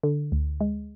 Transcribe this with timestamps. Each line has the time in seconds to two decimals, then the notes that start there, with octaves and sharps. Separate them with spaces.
0.04 D3
0.32 D2
0.61 G#3